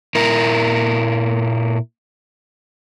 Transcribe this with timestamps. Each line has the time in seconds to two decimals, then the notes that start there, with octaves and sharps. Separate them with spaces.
0.15 A#2 E4 A#4